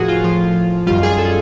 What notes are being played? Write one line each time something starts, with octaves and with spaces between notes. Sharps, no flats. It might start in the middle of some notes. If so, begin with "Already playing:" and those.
Already playing: A2 F3 F#4 G#4 A#4
F4
A2 F3 F4
F#2 D#3 G3 F4
G#4
A4